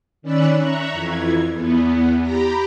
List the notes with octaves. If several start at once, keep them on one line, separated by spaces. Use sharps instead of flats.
D#3 C#4 D5 B5 E6 F#6
E5 A#5 C#6 F#6
F2 E3 G#6
E2 B3
G4 A#5 B5 A#6